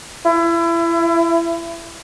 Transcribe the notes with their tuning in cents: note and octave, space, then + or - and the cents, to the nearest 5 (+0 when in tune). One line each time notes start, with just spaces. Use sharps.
E4 +30